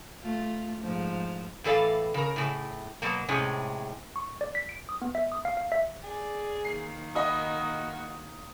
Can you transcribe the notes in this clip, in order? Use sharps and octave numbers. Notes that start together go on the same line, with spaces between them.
A3 F4
G#2 F3
A2 E3 A4 D5 F5
C#3 A#4
A2 C#3
B2 F#3 A#3
A2 C3 G#3 C#4
C#6
D5
B6
D7
D#6
B3
E5
D#6
F5
F5
E5
G#4 D5
D#3 A#3 C7
F#4 D#5 B5 D#6